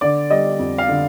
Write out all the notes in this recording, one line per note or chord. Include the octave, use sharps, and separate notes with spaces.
D3 D5
G3 D#5
F2
F5
D3